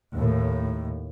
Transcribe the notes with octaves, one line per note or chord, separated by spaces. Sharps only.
D#2 A2